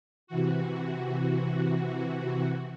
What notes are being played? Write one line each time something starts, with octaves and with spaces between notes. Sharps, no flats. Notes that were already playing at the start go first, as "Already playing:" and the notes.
C3 E3 F#4